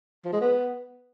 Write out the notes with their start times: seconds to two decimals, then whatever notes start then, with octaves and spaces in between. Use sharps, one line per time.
0.25 F3
0.33 G#3
0.41 B3